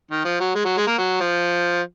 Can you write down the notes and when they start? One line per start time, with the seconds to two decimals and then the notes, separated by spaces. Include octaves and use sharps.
0.11 D#3
0.25 F3
0.41 F#3
0.55 G#3
0.65 F#3
0.77 G#3
0.88 A#3
0.99 F#3
1.21 F3